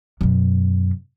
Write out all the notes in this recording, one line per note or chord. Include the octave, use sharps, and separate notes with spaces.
F#2 B2